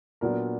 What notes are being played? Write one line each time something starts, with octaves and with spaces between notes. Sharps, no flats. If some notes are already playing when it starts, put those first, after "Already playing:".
A#2 F#3 B3 D4 A#4